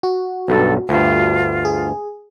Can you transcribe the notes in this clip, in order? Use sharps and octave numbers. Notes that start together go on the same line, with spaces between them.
F#4
B1 G2 A4
D2 G2 F4
G#4